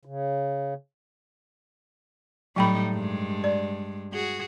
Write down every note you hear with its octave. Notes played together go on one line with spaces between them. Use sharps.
C#3
A2 F#3 G3 D#4 G5 B5
G2 G#3
D5
F#4 G#4